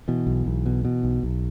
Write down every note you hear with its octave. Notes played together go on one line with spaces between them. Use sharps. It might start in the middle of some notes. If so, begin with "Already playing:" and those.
B2 E3
B1
B1
B2
B2
B1
B1